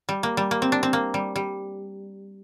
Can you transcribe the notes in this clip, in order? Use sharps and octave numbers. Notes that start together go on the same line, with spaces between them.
G3
A#3
G3
A#3
C4
D4
C4
A#3
G3
G3